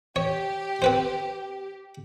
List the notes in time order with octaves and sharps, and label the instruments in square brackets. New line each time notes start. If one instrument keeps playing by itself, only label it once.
[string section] G4 [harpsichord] C#5
[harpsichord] C4 B4 C5